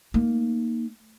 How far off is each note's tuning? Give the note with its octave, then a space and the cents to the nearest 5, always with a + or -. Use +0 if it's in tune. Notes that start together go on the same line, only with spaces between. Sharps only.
A#3 +0 D#4 +0